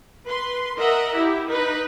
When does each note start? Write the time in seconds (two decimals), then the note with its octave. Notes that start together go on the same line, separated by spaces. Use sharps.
0.26 B4 C6
0.78 A#4 D#5 E5 F#5 A#5
1.17 E4 G4
1.50 D#4 B4